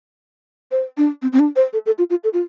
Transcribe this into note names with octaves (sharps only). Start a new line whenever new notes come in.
C5
D4
C4
C4
D4
C5
A4
A4
F4
F4
A4
F4